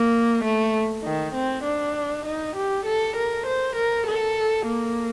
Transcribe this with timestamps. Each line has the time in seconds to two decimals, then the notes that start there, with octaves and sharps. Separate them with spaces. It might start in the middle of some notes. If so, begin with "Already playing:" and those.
Already playing: A#3
0.44 A3
1.04 D#3
1.35 C4
1.64 D4
2.26 D#4
2.56 G4
2.86 A4
3.16 A#4
3.47 C5
3.76 A#4
4.07 A4
4.67 A#3